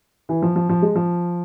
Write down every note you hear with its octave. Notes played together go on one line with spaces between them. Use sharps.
E3
F3
F3
F3
G#3
F3